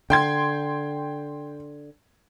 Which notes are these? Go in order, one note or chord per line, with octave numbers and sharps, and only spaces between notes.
D3 G5 C6 G#6